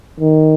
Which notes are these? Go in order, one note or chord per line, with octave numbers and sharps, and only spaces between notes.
D#3